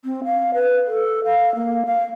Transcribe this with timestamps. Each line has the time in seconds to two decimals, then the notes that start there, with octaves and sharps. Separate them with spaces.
0.05 C4
0.25 F5
0.54 B4
0.87 A4
1.25 F5
1.55 A#3
1.86 F5